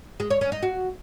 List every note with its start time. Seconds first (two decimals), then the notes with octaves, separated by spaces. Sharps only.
0.20 G#3
0.30 C#5
0.41 C#4
0.52 D#4
0.63 F#4